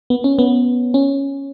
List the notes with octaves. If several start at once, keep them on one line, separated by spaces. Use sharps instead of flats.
B3
C#4
B3
C#4